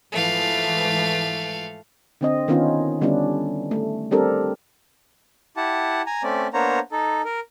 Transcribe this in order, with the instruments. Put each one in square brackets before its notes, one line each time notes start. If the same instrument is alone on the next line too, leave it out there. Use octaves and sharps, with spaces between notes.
[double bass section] G#2 E3 F3 [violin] A3 F5
[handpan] D3 C4 D#5
D#3 B3 C#4 D#4 F4
D3 G3 B3 C#4 D4 E4
A3
G3 C4 D4 G4 A4 A#4
[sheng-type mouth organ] E4 G4 F#5 A5
G#5 A#5
A3 C4 C#4 D5
A#3 B3 D4 C5 C#5 A#5
D#4 A4
A#4